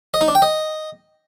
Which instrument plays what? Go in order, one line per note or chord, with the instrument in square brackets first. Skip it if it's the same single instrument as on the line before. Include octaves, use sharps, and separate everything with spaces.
[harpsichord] D#5
D#4
D4
G5
D#5